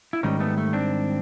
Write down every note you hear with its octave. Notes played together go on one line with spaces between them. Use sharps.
E4
G#2 D#3 G3 C#4 D#4
A3 B3
A3
C4 D4